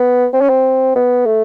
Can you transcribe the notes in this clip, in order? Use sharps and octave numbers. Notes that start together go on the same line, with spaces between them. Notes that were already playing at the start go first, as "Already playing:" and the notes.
Already playing: B3
C4
C#4
C4
B3
A3